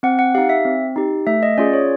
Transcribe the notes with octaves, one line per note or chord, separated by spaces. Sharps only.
C4 F#5
F#5
D#4 G4 F5
E5
C4
D#4 G4
A3 E5
D#5
C#4 F4 G#4 D5
C#5